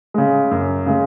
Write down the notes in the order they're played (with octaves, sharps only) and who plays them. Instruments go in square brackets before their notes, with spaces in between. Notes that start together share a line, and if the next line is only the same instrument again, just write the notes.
[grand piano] C#3 G#3
F#2
C#3 G#3